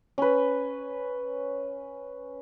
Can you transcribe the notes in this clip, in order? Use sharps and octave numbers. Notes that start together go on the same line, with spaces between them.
C#4 B4